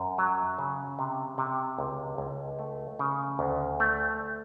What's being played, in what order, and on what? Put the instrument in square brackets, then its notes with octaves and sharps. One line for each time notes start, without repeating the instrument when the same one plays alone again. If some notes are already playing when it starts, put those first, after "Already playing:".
Already playing: [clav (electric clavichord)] F#2
F#3
C#3
C3
C3
C#2
C#2
A3
C#3
D2
A3